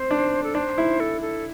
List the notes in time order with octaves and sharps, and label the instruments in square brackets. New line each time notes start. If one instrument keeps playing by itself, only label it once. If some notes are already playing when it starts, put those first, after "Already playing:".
Already playing: [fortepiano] C4 [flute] C5
[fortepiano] D4
[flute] A4
[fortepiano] D4 [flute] C5
[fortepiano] E4
[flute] A4
A4